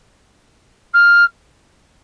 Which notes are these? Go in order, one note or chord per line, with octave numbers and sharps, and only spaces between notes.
F6